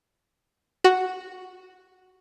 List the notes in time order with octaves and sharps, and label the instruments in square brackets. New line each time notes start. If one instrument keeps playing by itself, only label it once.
[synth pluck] F#4